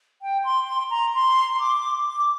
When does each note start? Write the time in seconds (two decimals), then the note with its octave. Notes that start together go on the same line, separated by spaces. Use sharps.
0.22 G5
0.44 C6
0.67 C6
0.90 A#5
1.14 C6
1.60 D6
2.06 D6